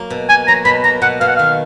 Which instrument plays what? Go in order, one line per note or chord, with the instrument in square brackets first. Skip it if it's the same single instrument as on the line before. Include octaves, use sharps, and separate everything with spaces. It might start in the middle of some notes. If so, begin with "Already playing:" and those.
Already playing: [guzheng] F#3 A#3
B2
[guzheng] A#3 [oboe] G#5
[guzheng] F#3 [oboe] A#5
[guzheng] B2 [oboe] B5
[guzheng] A#3 [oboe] A#5
[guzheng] B2 [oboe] F#5
[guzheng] B2 [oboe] F5
[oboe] F#5
[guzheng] D#3 [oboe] F5